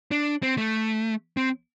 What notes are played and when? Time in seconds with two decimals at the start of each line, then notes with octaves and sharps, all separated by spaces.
0.11 D4
0.42 C4
0.58 A3
1.37 C4